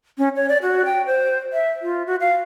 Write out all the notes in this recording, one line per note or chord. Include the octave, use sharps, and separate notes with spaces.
C#4
C#5
D5
F#4
G5
C5
E5
F4
F#4
F5